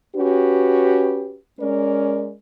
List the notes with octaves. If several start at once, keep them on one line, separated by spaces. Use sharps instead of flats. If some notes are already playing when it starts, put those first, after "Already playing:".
C#4 F#4 G4 B4
G#3 C#4 A#4 D5